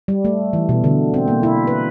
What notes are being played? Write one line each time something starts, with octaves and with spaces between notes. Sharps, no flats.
G3
A3
E3
B2
D3
C4
A#3
E4
B4